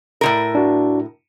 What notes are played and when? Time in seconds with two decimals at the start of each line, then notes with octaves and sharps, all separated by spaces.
0.21 A2 F3 A#4
0.55 D4 F#4